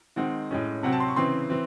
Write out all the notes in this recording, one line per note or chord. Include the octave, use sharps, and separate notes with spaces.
D#3 G#3 C4 F#5
A2 G#3 C#4
C3 F#3 C4 F#5
A5
C6
C#6
C#3 E3 C4 C6
E3 C4